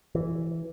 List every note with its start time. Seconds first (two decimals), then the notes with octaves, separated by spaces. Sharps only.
0.15 E3